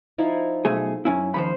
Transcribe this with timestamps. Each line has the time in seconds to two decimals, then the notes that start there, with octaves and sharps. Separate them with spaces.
0.18 F3 D#4 E4
0.65 B1 A3 G#4
1.05 F#2 C#4 E4
1.34 D#2 F3 C#4 C5 B5